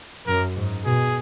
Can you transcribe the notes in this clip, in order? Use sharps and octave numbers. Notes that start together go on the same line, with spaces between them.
F#2 A#4
G#2
B2 G#4